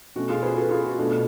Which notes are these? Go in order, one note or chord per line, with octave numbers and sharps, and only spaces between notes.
B2 A3 C#4 F#4
F4 G#4
G#4 B4
F#4 A4
F4 G#4
F#4
B2 A3 D4